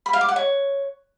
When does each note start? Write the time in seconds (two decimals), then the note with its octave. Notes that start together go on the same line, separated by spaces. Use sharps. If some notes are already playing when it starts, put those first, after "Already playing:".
0.06 B5
0.13 F5
0.21 D6
0.29 F#5
0.36 C#5